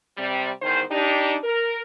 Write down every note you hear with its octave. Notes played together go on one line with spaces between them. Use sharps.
C3 G3
E2 G#2 D#3 C5
D4 D#4 G4
A#4